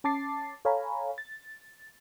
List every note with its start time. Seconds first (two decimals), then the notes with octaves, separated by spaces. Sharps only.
0.04 C#4 A5 D6 A6 C7
0.65 A4 C#5 F5 G#5 A#5 B5
1.18 A6